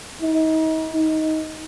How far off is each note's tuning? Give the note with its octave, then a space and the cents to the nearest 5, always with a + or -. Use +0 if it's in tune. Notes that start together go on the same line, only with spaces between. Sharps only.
D#4 +35
D#4 +15